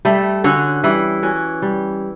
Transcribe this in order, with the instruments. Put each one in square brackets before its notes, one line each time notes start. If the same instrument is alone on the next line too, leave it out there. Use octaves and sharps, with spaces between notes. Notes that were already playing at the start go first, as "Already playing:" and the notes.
[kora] G3 [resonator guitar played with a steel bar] A3
[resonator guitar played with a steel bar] D3 [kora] C#4 F#4 C#5
[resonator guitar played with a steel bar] E3 [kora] G3
[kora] C#4 F#4 C#5
G3